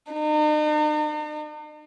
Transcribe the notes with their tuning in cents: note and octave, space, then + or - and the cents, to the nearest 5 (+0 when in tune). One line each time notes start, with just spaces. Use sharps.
D#4 -45